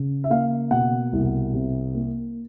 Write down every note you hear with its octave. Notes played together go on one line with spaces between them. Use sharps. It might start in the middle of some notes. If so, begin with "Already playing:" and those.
Already playing: C#3
E5
A#3 F5
B2 F#5
C2
C3
A#3